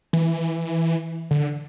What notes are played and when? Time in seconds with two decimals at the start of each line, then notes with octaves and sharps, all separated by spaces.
0.13 E3
1.31 D3